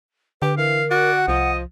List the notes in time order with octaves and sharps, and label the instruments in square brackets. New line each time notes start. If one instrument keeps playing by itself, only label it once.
[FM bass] D3 [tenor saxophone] G4 [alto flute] B4
[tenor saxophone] E3 [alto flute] A#4 [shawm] F5
[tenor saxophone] F#4 [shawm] D5
[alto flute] F#5
[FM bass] C2 [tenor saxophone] F3 [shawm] D#5